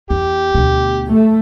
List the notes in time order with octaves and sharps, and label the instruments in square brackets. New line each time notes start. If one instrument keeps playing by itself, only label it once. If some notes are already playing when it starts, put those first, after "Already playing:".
[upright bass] E2 [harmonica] G4
[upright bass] D2 B2
[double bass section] A3